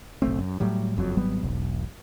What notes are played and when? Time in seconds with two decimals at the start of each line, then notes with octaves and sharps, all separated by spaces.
0.22 F#1 B1 A3 C4
0.39 F#2
0.60 A2 F#3 G3
0.97 F#1 F2 A#2 F#3
1.17 G#1 F#3 G3 B3
1.42 E1 B1